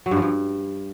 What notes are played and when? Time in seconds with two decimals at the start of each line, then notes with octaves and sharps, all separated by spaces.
0.06 F#3
0.11 G2
0.17 F3
0.22 G2